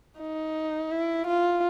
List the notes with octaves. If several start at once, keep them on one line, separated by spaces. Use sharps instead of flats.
D#4
E4
F4